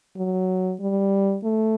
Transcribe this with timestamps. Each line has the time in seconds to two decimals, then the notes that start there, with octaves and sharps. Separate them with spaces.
0.17 F#3
0.80 G3
1.44 A3